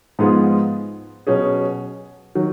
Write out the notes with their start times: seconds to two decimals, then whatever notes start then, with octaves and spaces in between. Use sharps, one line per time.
0.19 G#2 F3 B3 F4 G#4
1.27 B2 F#3 C#4 G#4
2.35 D#3 F#3